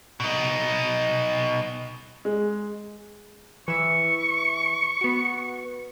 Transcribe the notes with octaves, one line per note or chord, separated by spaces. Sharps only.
B2 D#4
G#3
E3 E5 C#6
B3 F#4